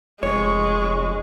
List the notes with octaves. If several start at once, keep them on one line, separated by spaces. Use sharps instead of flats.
F1 G#3 C#5 C#6